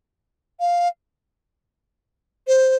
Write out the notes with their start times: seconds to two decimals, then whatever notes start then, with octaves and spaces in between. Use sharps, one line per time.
0.60 F5
2.48 C5